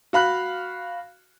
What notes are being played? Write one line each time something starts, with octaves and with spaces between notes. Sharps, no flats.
F#4 F5 B5 F#6